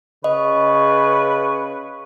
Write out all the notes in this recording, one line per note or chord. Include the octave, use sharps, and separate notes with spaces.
C#3 B4 D#5 C#6